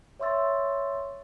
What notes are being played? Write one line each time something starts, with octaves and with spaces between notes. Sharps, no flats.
C#5 E5 C6 C#6 E6 A6